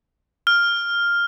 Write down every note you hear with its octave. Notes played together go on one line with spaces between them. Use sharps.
F6